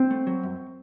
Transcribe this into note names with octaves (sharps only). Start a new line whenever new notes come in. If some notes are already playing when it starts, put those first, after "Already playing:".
Already playing: C4
A3
F#3
F#2